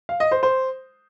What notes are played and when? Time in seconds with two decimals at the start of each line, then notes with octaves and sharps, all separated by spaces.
0.09 F5
0.20 D#5
0.32 C5
0.43 C5